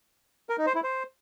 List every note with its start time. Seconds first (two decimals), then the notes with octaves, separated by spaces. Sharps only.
0.49 A#4
0.58 D#4
0.67 C5
0.75 E4
0.84 C5